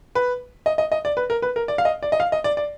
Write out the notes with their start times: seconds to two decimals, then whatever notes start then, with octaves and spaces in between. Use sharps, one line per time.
0.15 B4
0.66 D#5
0.78 D#5
0.92 D#5
1.05 D5
1.17 B4
1.30 A#4
1.42 B4
1.56 A#4
1.68 D5
1.78 F5
1.85 D#5
2.03 D5
2.12 D#5
2.20 F5
2.32 D#5
2.44 D5
2.57 D5